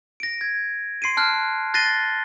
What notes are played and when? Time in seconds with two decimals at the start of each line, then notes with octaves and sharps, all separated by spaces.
0.20 A#6 D7
0.41 G#6
1.02 C6 C7 D7 D#7
1.17 A5 F6 F#6
1.74 F#6 A6 A#6 C7 D#7 G7